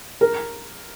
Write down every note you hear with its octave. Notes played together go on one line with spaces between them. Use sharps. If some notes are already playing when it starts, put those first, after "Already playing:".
A#4